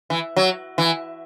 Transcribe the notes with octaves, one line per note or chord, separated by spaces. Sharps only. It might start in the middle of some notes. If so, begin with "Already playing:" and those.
E3
F#3
E3